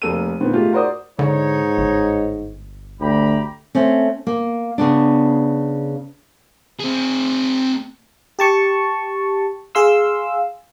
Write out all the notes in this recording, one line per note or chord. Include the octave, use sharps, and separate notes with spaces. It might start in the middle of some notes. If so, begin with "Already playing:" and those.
F1 A#3 A4 E6 D#7
A#2 D3 D#3 B3 C4
G#2 A3 F4 G4
F#4 A#4 C5 D5 D#6
G#2 D3 D#4 C#5
G1
D2 G4 A#5 B5
A3 C4 C#4
A#3
C#3 B3 D4
C4 G#4
G4 A5 C#6
G#4 F5 C6 E6